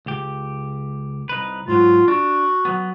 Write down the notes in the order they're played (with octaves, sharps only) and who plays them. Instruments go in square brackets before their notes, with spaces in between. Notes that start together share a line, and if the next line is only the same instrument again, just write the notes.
[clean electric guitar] C#2 G4
C2 D#4 B4
[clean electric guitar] G#2 F#3 [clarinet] F4
[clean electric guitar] D4 [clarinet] F#4
[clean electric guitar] F#3 B3